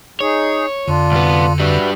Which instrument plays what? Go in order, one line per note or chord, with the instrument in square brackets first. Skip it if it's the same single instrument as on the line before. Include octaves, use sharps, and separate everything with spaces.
[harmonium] D#4 G#4 [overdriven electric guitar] C#5
[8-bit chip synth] F2 D3 [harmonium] D4 F4
[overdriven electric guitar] C2 B3
[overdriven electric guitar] G3 D4 [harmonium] F#4 B4 E5